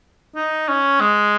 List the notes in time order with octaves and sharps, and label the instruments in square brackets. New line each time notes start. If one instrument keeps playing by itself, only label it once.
[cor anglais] D#4
C#4
G#3